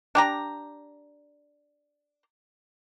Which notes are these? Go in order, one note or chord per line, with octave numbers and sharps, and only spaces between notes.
D4 G4 A#5